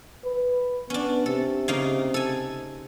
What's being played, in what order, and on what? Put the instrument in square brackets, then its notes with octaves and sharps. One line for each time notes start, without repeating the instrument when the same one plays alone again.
[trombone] B4
[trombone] B3 [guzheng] C#4 D4
[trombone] C3 [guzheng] A4
[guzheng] C#3 A#3 D#4
A4 G#5